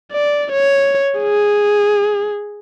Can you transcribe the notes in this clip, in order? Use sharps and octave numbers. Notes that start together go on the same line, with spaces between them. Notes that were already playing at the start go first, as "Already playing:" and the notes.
D5
C#5
G#4